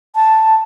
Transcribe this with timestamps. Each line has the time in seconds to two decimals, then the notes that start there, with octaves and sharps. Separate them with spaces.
0.15 A5